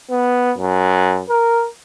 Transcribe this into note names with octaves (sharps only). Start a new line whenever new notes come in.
B3
F#2
A#4